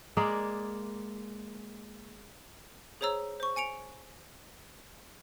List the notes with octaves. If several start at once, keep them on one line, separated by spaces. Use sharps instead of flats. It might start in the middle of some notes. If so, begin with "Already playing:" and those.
G#3 A#3 G#4 D5
G#4 C5 C#5 A#5 E6
C5 C#6
G#5 C#7 D7 F7